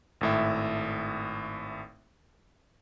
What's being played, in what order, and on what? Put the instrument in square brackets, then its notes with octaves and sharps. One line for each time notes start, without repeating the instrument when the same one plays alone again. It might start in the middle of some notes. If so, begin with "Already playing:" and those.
[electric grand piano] G#1 A2 E5